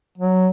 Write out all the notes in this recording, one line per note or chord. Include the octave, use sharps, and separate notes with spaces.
F#3